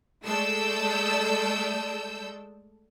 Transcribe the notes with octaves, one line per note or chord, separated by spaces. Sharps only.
G#3 A3 A4 D5 E6 G6